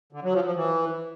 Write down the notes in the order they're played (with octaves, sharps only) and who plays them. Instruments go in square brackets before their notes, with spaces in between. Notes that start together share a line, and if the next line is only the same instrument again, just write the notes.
[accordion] D3
F#3
F3
F3
E3